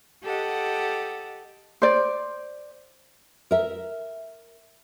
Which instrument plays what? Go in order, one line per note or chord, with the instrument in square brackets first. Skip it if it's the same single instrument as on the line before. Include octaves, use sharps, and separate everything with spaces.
[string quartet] G4 A4 D#5 F#5
[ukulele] C5 D5
[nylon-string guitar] A#4 E5